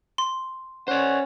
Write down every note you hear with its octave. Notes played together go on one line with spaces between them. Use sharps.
C6
C#4 C5 D5 F#5